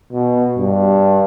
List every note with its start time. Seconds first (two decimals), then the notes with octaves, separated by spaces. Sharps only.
0.12 B2
0.58 G2